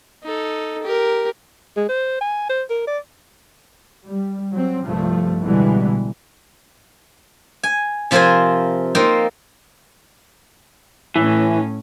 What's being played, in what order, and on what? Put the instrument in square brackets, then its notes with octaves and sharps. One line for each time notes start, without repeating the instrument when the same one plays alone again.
[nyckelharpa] D#4 A4
G4 A#4
[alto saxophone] G#3
C5
G#5
C5
A#4
D5
[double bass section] G3
F#3 C4
C2 G2 F3 A3
A1 B2 D3 E3 G3 G#3
[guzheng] G#5
C3 F3 F4 A#4 C5 G#5
A#3 C4 D#4 F4 C5
[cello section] A2 C#4 [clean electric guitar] E3